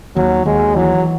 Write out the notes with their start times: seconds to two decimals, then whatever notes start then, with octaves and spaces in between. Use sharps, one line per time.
0.16 D#2 F#3
0.46 D#2 G#3
0.76 E3 F#3